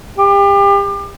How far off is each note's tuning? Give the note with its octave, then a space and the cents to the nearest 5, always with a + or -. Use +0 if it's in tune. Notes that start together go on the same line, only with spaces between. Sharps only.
G4 +30